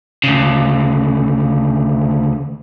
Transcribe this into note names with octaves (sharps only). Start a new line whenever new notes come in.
D2 C#3